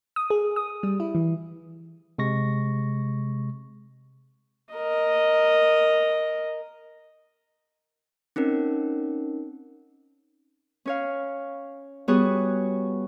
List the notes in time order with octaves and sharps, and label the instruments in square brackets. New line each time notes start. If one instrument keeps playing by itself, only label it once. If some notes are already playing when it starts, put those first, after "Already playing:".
[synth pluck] D#6
G#4
D#6
G3
E4
E3
[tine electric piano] C3 G#3 C#6 A#6
[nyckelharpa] A#4 D#5
[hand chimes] C4 C#4 D#4 A#4
[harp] C#4 C#5 F5
G3 B3 F#4 G#4 C#5